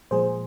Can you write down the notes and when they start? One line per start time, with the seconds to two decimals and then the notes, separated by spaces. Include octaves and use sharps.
0.11 A#2 F3 G#3 G#4 C5